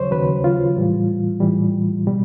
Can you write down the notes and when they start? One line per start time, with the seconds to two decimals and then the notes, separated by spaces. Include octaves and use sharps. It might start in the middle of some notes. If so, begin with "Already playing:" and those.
Already playing: D#2 C#3 F#3 C5 C#5
0.11 D#2 C#3 F#3 B4
0.44 F4
0.76 A2 E3 G3
1.40 A2 E3 G3
2.07 B2 G3